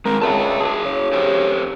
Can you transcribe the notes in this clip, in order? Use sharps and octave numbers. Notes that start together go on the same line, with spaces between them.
G#3 C4 A#4
C#2 D5 E5 A5
F#4 G#4
C#3
G4 A4 C5